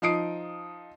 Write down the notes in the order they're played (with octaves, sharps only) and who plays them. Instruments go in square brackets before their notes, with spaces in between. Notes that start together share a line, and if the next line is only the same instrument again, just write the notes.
[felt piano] F3 D#4 D#6 C7 D7